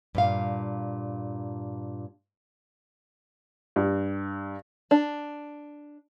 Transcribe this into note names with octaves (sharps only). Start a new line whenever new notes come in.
G2 A#2 F5
G2
D4